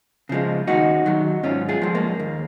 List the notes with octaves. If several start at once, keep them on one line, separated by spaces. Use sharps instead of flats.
C#3 F3 G#3
D#2 D#4 F#4
D#3 F#3
G#2 C#4 F4
F4 G#4
F3 G#3
A#3
D#2